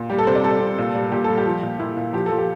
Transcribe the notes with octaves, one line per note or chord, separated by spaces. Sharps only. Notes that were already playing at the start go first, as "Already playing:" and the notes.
Already playing: A#2
G3 G4
A4
C3 C5
D5
G3 A4
C3
A#2
G3
A#2 G4
G3 A4
G4
F3
A#2
A#2 E4
A#2
F3 G4
F3 A4
G4